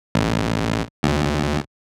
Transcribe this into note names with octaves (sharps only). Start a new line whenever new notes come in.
A1
D2